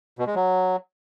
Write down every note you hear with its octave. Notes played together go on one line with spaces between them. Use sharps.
B2
G#3
F#3